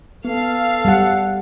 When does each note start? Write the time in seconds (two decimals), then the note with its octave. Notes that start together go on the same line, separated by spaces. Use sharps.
0.25 B3 A4 F5
0.85 G3 F#5